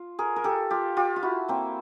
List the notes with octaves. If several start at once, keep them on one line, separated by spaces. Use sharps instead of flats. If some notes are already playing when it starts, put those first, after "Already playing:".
Already playing: F4
G#4 A#4
A#4
G4 A4
F4 G4
F4 G4
F4
E4 F#4
A#3 C4